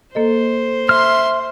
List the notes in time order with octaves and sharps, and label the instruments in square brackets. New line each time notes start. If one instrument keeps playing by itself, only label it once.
[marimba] A#3 A4 D#5 [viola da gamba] C5
[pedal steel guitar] E5 F6 [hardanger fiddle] C6